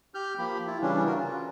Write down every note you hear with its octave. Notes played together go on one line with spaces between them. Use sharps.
G4 F6 G6
F3 A#3 G4 B5
E4 F4
C#3 E3 G3 C#4 D4
C#3 F#4 A#4
F4